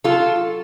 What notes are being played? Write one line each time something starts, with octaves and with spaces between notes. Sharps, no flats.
F#3 F4 A4